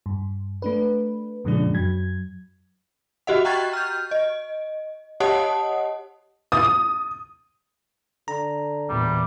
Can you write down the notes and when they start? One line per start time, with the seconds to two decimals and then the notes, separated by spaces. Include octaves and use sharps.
0.06 G2
0.62 A3 D4 B4
1.44 F2 A#2 C#3 F3 G#3 D4
1.73 F#2 F#3 G#6
3.27 F#4 G4 D#5 F#5
3.45 G5 A#5 C#6 F#6 G#6 A6
3.73 F6 G6
4.11 D#5
5.20 G4 C#5 D#5 F#5 A5 D#6
6.52 D#6
8.28 D3 A#5
8.89 E2 A#2 G3